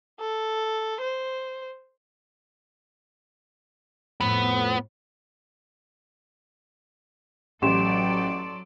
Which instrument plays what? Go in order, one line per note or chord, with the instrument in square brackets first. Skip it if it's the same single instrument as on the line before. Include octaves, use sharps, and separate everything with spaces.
[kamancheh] A4
C5
[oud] F2 A2 [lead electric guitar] B3
[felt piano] A1 G4 [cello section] F#3 A4 D5 [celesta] C6 E7